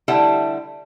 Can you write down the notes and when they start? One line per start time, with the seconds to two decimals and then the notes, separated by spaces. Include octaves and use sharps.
0.08 D3 G3 A3 E4 A4 F#5